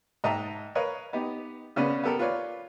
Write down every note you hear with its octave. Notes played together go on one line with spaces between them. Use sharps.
G#2 D#5 E5 G5 A5 A#5
A#4 B4 C#5 D#5 F5
B3 D#4 G4
C#3 B3 C#4 B4 D5 F5
B3 G4 A4 A#4
F4 B4 C#5 D5